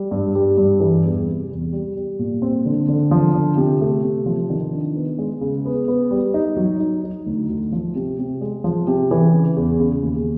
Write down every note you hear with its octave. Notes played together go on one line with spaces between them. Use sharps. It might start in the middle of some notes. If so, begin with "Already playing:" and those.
Already playing: G3
G2
G3
G2
E3
E2
C3
E2
G3
G3
A#2
C4
D3
D3
F3
D3
C3
A3
C3
F3
D#3
D4
B3
G#3
C#3
B3
B3
G3
D#4
F#3
D#4
D#4
D2
D2
F3
C3
C3
G#3
F3
C3
E3
C#3
E2
C#3
D#2